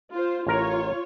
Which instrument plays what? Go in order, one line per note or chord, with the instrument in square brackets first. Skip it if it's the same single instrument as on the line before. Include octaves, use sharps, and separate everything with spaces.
[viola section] F4 C5
[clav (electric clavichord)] A1 A#4 A#5 [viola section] F4 C#5